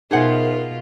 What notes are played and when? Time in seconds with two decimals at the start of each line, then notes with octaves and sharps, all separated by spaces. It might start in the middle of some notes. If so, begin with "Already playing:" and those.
0.11 B2 D#4 F4 G#4 A#4 C5 E5 F#5